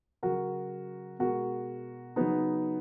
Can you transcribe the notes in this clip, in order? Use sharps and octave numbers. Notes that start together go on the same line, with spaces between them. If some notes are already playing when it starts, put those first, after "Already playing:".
C#3 F#3 F#4 A#4
B2 G#3 F#4 A#4
C#3 F#3 B3 D#4